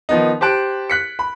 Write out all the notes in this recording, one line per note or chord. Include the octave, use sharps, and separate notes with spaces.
D#3 F3 B3 D#4
G4 C5 A5 F#6 D7
F#6 B6 C#7
B5